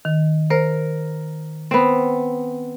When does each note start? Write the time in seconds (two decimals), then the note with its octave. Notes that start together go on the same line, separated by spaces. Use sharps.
0.05 D#3
0.50 A#4 C5
1.71 B3 C4